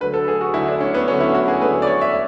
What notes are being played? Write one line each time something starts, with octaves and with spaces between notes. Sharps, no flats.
D3 F#3 A3 B4
A4
G#4
F#4
D3 F#3 A3 E4
D4
C#4
B3
D3 F#3 A3 C#4
E4
F#4
G#4
D3 F#3 A3 B4
D5
C#5
E5